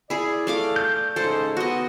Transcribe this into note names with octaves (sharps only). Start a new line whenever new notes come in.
E4 G#4 D5
A3 F5 D6
G6
G#2 C#3 A4 C5
B3 F#4 D#5